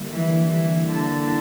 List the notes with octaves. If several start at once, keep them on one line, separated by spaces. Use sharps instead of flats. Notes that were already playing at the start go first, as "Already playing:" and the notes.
Already playing: D3 G3 A#3 E4
E3
E3
D3